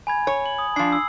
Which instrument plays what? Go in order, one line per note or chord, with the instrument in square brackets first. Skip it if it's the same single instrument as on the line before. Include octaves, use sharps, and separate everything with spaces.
[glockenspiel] G#5 B5 G#6
[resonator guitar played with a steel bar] C#5
[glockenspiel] F#7
D#6
[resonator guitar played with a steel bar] F3 D4 [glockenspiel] C7
[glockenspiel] E6